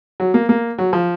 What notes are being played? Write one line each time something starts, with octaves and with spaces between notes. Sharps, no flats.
F#3
A#3
A#3
F#3
F3